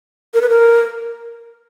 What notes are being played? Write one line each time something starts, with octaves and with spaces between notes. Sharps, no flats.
A#4
B4
A#4